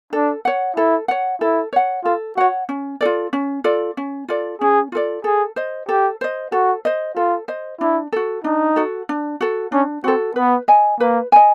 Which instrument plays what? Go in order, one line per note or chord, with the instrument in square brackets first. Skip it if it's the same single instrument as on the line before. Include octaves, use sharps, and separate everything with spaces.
[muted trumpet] D4 [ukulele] A4
[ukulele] C#5 F#5
[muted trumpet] E4 [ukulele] A4
[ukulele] C#5 F#5
[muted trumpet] E4 [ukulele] A4
[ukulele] C#5 F#5
[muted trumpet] F4 [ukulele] A4
[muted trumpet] F#4 [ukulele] C#5 F#5
[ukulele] C#4
F4 A4 D5
C#4
F4 A4 D5
C#4
F4 A4 D5
[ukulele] C#4 [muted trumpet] G#4
[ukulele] F4 A4 D5
[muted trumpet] G#4 [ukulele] A4
[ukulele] C5 D#5
[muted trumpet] G4 [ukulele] A4
[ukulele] C5 D#5
[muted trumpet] F#4 [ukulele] A4
[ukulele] C5 D#5
[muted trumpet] F4 [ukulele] A4
[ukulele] C5 D#5
[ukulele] D4 [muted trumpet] E4
[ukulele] F#4 A4
[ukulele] D4 [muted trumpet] D#4
[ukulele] F#4 A4
D4
F#4 A4
[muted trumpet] C#4 [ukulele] D4
[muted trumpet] C4 [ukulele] F#4 A4
[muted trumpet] B3 [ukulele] B4
[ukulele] D#5 G#5
[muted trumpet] A#3 [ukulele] B4
[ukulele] D#5 G#5